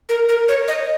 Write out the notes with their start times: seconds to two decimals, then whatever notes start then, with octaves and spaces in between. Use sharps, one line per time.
0.09 A#4
0.29 A#4
0.48 C#5
0.68 D#5